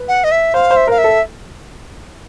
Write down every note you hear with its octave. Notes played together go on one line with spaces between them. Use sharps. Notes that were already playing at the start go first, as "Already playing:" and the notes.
Already playing: B4
F#5
D#5
E5
C5 F5
C5
E5
A#4 F5
E5
A4